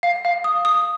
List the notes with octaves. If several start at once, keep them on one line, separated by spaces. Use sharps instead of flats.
F5
F5
D#6
D#6